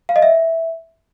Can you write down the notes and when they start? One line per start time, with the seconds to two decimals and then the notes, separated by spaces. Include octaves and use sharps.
0.09 F5
0.16 D#5
0.22 E5